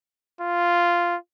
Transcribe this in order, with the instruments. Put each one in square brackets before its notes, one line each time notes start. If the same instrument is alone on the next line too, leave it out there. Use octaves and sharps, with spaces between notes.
[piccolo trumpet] F4